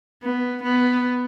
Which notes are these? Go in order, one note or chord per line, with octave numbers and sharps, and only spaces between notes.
B3
B3